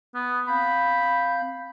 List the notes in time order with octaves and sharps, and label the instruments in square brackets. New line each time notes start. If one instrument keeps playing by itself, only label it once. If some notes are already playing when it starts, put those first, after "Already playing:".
[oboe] B3
[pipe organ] C4 F5 G6 [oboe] B5